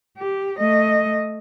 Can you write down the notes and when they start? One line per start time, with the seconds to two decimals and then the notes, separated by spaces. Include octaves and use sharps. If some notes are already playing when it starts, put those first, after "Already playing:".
0.17 G4
0.59 A3 D#5